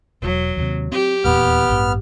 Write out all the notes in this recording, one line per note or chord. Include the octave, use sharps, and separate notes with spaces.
E1 F#3
D#2 C3
C4 G4
D#1 E2 A#2 B3 F6
A1 G2